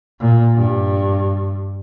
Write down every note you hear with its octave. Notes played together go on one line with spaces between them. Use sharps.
A#2
G2